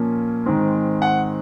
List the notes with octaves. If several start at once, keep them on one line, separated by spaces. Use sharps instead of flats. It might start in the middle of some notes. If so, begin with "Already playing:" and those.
Already playing: A#2 F3 A#3 C#4
G#2 D#3 G#3 C4
F#5